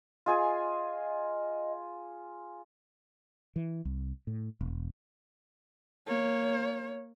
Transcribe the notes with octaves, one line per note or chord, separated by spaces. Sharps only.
F4 G#4 D#5 G#5
E3
C2
A2
E1
A#3 C#5